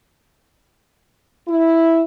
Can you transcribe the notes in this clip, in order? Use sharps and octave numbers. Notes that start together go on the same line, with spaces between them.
E4